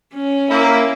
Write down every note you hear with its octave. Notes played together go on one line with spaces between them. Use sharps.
C#4
A#3 E4